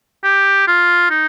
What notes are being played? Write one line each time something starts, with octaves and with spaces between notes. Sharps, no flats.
G4
F4
D#4